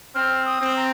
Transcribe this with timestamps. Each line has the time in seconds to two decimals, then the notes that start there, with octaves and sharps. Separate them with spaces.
0.14 C4 F6
0.46 D#6
0.60 C4
0.76 A#5